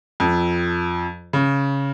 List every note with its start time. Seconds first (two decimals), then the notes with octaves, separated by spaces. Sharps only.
0.20 F2
1.33 C#3